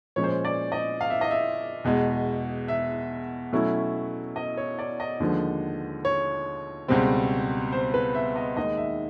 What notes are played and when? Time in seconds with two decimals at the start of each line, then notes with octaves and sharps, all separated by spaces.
0.16 A#2 F3 G#3 C#4 C#5
0.24 C5
0.30 C#5
0.45 D5
0.72 D#5
1.01 F5
1.10 E5
1.21 D#5
1.31 E5
1.84 E2 B2 G#3
2.68 E5
3.53 B2 F#3 A3 C#4 E4
4.36 D#5
4.57 C#5
4.79 D5
5.00 D#5
5.20 D#2 D3 F3 G#3
6.05 C#5
6.88 C#2 B2 G3 C4
7.72 C5
7.94 B4
8.15 E5
8.36 D#5
8.57 D#2 D#3 G#3 D#5
8.77 E5